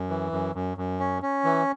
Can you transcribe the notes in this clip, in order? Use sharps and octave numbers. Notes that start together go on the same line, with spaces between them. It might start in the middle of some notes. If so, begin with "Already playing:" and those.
Already playing: F#2
E3
F#2
F#2
F#2
C#4
C#4
E3